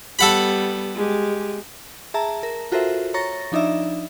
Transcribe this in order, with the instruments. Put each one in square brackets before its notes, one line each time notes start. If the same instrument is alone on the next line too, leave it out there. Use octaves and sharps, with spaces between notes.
[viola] G3 B3 [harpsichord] A4 F#5 B5
[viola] G#3 G4
[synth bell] G#4 E5 A5 A#5
A#4
F4 F#4 A4 A#4 C5 E5
C#5 A#5 C#6 A6 A#6
F3 D4 D#4 D5 E5